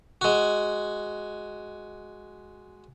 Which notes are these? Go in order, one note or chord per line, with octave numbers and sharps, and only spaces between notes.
G#3 F#4